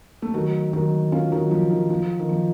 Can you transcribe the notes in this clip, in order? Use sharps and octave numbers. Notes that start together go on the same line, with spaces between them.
A3
D#3 F#3
D#3 F#3
C#4 F4
D#3 F#3
F3
D#3
F3
D#3
F3